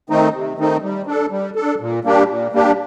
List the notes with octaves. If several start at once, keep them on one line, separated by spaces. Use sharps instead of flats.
D#3 A3 C4 D#4
C3
D#3 A3 C4 D#4
G3
D4 A4
G3
D4 A4
A#2
G3 A#3 D4 G4
A#2
G3 A#3 D4 G4